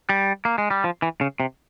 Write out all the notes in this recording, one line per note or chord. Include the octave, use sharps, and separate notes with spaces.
G3
A#3
G#3
G3
F3
E3
C#3
C3